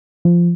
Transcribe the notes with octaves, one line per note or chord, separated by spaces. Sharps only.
F3